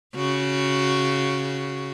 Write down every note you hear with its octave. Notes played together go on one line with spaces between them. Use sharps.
C#3 F#4